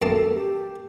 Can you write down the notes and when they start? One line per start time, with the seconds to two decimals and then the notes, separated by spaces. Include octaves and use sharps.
0.02 F#2 A#3 A4 A5
0.33 G4